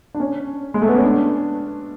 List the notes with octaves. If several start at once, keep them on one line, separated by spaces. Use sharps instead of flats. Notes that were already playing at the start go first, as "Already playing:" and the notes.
D4
C#4
G#3
A3
B3
C#4
D4